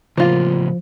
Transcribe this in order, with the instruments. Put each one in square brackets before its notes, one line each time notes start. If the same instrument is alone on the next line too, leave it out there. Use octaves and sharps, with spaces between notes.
[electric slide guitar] A2 C#3 [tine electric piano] F3 [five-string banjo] A#3 F4